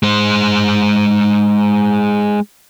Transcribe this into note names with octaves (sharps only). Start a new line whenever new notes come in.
G#3 C5